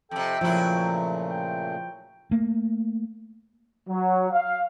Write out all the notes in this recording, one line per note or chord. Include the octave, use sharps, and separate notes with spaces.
F2 C3 A4 G5
A#2 C#3 F3 F#3 A3 E4
G5
A3 A#3
F#3
F5